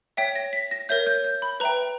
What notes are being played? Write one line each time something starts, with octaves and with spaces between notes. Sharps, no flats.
C#5 E5 G5 B6
A#6
B6
A#6
A#4 C#5 E5 G6
G6
G6
B5
B4 E5 G5 A#5